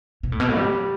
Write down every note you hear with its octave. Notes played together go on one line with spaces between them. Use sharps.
B2
A2
B2
A2
G3